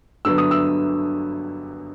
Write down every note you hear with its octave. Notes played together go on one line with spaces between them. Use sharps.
G2 D3 F#3 B3 E6
D#6
E6